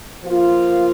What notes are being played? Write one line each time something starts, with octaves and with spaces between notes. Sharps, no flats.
F3 A#3 F4